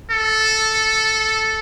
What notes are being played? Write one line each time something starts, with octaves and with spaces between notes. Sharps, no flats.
A4